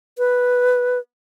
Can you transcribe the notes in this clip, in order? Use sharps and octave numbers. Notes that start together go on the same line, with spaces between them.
B4